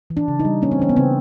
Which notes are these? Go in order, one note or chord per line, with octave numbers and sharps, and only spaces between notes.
E3
D4
C#3
D#4
G3
A#3 C#4
C4
E3 C#4
B3
C#3 C4